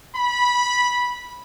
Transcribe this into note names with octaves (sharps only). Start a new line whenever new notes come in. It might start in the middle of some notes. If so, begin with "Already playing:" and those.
B5